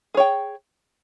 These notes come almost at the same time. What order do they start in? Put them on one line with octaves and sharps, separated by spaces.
G#4 C#5 G5